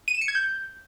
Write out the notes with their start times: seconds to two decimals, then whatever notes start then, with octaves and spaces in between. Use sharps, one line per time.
0.08 D#7
0.15 E7
0.21 C#7
0.28 G#6
0.35 G6